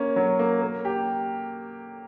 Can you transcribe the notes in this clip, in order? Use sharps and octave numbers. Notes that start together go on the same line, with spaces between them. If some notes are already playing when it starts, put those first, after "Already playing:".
Already playing: A#3 C#4
F#3
A#3
A#3
G4